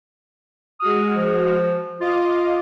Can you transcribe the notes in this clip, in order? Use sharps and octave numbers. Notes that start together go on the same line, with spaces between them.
G#3 F#4 D#6 F6
F3
F4 D#5 F5 D6